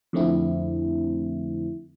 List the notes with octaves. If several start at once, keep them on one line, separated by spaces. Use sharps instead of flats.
F2 D3 A3 C4 E4